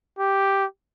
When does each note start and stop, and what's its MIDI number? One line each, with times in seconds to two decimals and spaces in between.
0.19 0.65 67